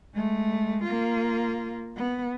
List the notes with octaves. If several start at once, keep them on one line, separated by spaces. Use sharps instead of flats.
G#3 A3
A#3 F4
B3